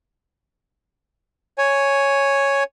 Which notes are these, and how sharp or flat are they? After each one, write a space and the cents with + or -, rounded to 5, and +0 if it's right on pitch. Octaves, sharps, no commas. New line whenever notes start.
C#5 +0 G#5 +0